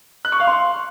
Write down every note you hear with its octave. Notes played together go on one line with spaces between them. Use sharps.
F#6
C#6
F5
C6